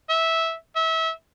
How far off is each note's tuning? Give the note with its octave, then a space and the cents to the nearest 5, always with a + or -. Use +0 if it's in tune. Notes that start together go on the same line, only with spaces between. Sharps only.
E5 -10
E5 -25